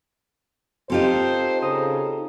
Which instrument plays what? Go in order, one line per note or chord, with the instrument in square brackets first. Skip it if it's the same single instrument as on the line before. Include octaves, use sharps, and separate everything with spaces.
[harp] C4 F4 [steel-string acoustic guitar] D#4 G4 A4 [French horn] C5
[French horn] C#3 [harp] A#5 D#6